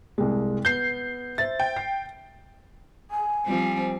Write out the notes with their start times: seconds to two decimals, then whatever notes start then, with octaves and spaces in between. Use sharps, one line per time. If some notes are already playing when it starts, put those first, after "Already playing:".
0.18 C2 G#3
0.65 B3 G6 C7
1.38 C5 E5 A6
1.60 G5
1.77 C7
3.11 G#5
3.46 F3 G3 C4